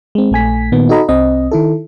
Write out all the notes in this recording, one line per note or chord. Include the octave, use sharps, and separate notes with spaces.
G#3 C4
A#1 A3 G#5 B6
A#2 D#3 B3
D#4 F#4 A4 D#5 A#5 B5
C2 C4 D#5
D#3 E4 A4